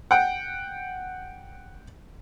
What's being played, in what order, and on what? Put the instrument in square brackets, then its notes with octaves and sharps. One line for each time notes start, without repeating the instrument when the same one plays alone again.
[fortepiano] F#5 G5